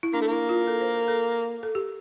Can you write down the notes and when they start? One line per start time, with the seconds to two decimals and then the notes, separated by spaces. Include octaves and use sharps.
0.03 E4
0.13 A#3 D4
0.21 A3
0.28 A#3 E4
0.49 F4
0.67 A4
0.81 C5
0.94 A#4
1.08 A4
1.63 A4
1.75 G4